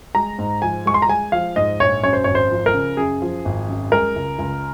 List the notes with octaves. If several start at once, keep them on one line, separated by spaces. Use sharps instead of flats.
G#3 A#5
G#2
F3 G#5
G#3 C#6
C6
A#5
G#3 G#5
F3 F5
G#2 D#5
A#1 C#5
F#2 C#5
C5
G#1 C#5
C5
F3
A#4
C#3
F#2 G#4
F3
G#1
F#2
G#3 A#4
C#2
C#2